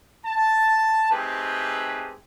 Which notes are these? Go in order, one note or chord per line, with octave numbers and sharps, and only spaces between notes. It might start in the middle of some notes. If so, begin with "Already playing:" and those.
A5
A3 C4 D#4 G4 G#4 B4